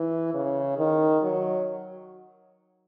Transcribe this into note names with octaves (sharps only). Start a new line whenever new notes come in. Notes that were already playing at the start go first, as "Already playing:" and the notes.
Already playing: E3
C#3
D#3
F#3